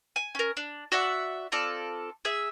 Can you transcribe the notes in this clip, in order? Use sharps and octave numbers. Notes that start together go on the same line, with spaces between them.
G#5
C#4 A#4
D4
F#4 D5 E5 F#5
C4 F4 A4 D5
G#4 E5